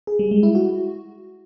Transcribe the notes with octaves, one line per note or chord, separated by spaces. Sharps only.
G#4
G3
G#3
E4
F#4